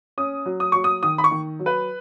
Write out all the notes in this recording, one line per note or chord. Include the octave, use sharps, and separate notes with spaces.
C#4 D#6
F#3
D#6
F#3 C#6
D#6
D#3 D#6
B5
C#6
D#3
F#3
B4